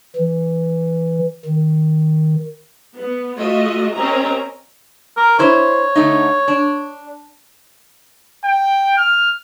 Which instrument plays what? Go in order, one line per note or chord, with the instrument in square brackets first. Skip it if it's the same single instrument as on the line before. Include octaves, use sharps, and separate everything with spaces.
[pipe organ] E3
D#3
[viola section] B3
A3 F4 F#4 D#5 E5
C4 C#4 G4 A#4 D#5 A#5
[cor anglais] A#4
[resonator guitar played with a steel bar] D4 E4 C5 [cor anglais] C#5
[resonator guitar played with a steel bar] D3 A3 D#4
D4
[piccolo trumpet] G5
F6